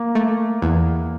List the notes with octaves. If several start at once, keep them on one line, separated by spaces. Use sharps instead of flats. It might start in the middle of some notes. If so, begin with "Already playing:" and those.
Already playing: A#3
A3
E2